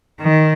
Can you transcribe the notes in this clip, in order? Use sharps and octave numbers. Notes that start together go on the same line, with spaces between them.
D#3